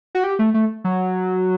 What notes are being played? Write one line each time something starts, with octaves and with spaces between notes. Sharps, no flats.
F#4
G4
A3
A3
F#3